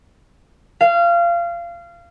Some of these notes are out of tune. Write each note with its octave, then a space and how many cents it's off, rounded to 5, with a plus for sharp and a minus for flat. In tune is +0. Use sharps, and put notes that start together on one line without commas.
F5 -25